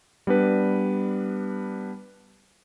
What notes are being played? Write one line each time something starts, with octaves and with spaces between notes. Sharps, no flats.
G3 B3 D4 B4